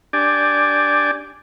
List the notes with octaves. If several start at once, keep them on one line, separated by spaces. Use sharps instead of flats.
D4 G4 D5 G#5